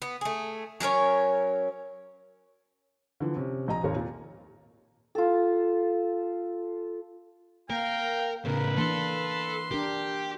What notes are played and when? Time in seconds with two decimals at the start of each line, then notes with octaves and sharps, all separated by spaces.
0.02 B3
0.21 A3 G#4
0.80 F#3 C#4 A#4 C#5
3.20 D3 E3 F3
3.36 C3 C#4
3.68 A#1 D#5 A#5
3.83 G#1 D#2 A#4 C#5
3.96 A#2
5.15 F4 A4
7.70 A#3 A#4 F5 G5
8.45 A2 C#3 A#4 B4
8.77 E3 A#3 D4 A4 C6
9.71 D4 G4 A#4